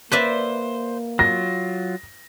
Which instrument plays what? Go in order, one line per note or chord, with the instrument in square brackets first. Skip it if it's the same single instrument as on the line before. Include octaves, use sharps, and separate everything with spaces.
[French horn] A#3 [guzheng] B4 D5 E5 [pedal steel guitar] C5
[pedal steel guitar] F#3 F4 [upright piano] A#6